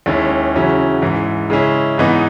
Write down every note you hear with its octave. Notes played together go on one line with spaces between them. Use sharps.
D#2 D#3 G#3 C#4 E4
E2 C#3 F#3 C#4 E4
G#2 E3 G#3
C#3 G#3 C#4 E4
G#2 E3 B3 D#4